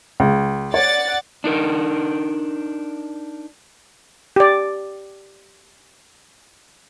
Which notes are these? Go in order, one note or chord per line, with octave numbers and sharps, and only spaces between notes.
C#2
C#5 D5 F#5 A6
D4 D#4 A#4
G4 D5